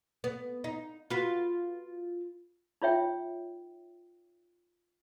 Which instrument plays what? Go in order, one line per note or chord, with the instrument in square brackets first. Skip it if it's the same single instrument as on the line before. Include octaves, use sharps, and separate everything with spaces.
[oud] B3
D#4
F4 F#4 B4
[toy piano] D#4 F4 C#5 E5 G5